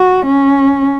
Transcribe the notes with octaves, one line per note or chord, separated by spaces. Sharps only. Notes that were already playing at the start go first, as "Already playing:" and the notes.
Already playing: F#4
C#4